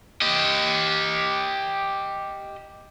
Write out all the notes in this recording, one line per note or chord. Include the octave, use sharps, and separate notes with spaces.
G4 D#5